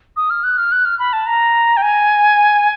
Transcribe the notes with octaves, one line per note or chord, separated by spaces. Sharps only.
D#6
F6
F#6
F6
F#6
F6
B5
A5
A#5
G5
G#5